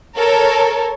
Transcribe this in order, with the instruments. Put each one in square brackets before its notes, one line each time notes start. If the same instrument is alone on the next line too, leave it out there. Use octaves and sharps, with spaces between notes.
[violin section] A4 A#4 C#5